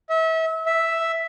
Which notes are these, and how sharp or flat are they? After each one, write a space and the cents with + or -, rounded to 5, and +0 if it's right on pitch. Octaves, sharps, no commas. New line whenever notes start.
E5 -30
E5 +0